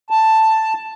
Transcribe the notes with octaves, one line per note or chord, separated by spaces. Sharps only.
A5